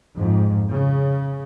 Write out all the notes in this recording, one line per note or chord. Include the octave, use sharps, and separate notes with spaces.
F2 G#2
C#3